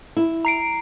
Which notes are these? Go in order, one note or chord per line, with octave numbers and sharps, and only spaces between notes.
E4
A#5 C7 D7